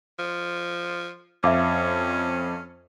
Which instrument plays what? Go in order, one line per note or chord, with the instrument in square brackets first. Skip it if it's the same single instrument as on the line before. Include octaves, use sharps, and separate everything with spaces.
[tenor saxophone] F3
[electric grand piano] F2 [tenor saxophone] C#4 [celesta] E5 F5 D6